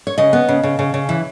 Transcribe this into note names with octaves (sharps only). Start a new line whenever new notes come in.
C#5
C#3 D#5
B3
C#3
C#3
C#3
C#3
E3